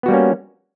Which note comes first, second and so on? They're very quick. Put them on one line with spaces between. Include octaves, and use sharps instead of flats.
B3 F#4 G3 A#3 C#4